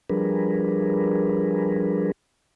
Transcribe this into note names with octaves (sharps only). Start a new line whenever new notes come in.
F3 G3 D4 G#4 A#4 B4